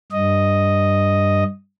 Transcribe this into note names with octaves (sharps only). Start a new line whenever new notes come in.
G2 D#5